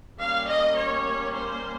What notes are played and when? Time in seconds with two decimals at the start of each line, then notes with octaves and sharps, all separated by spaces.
0.20 G3 A#3 C#4 F5
0.48 D#5
0.77 C#5
1.34 C5